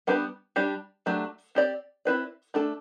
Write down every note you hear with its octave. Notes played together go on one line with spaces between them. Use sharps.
G3 B3 D4 G4 B4
G3 D4 G4
F#3 A3 D4 G4
C4 G4 D5
C4 E4 B4 D5
A3 D4 A4